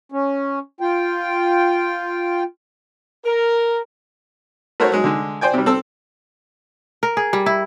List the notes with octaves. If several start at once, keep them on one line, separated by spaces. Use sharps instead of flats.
C#4
F4 G5
A#4
A3 F#4 A#4 C5 C#5
F#3 G#3
D3 G#3
C5 D5 G5 G#5
C3 G3
C4 A4 E6
A#4
G#4
G3
E4